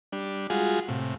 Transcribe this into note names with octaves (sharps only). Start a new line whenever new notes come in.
G3 D4
G3 G#3 F4 F#4 G#4
A2 C3